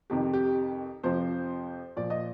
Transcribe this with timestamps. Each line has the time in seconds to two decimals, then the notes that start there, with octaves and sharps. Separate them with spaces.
0.10 F2 C3 D#3 G4
0.33 G4
1.03 F2 C3 F3 C5
1.97 A#2 F3 D5
2.10 D#5